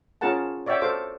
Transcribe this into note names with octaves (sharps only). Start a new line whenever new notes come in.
C#4 F4 G#4 A#4 F#5 A5
C#5 D5 E5 F#5 G5
F#4 A4 C5 F5 D6